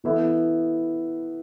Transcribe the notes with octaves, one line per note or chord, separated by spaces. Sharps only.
E3 B3 E4 A4